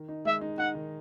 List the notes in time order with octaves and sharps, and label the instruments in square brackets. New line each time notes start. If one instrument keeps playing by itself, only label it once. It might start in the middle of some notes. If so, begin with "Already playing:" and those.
Already playing: [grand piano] D#3
D#4
[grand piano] G#3 [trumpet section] E5
[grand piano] D#4
[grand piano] D#4 [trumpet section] F#5
[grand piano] D#3